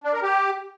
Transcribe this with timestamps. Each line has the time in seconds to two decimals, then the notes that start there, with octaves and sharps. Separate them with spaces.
0.04 D4
0.13 A#4
0.23 G4